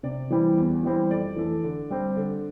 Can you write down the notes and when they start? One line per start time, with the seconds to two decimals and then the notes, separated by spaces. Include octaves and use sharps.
0.03 C3 D5
0.30 E3 G3 C4 E4
0.57 E2
0.83 E3 G3 C4 E4
1.11 F2 D5
1.36 E3 A3
1.64 D3
1.90 G3 C4
2.17 D3